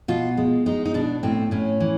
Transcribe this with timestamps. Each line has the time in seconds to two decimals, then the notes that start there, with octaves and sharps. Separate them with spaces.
0.08 B2 F4
0.37 G#3
0.66 G#3 D#4
0.85 D#4
0.94 B2 D4
1.23 A2 C4
1.51 A2 C#4
1.80 E3